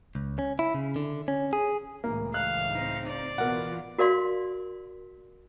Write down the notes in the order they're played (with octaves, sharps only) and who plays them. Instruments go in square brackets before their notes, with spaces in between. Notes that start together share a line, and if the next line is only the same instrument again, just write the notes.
[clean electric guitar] C#2
C#4
E4
C#3
D3
C#4
G#4
[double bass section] C#2 A2 E3 [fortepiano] A#3
[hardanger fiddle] F5 [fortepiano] F#6
[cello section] C4 D#4
[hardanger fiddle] D5
[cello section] B2 E3 F4 [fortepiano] A#4 F#5
[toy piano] F#4 A#4 D5 F5 C6